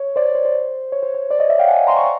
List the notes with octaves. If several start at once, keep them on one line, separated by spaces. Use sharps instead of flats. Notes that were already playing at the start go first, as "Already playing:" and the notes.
Already playing: C#5
C5 D5
C5
C5
C#5
C5
C#5
C5 D5
C#5 D#5
D5 E5
F5 G5
F#5 G#5
A#5 C6
C#6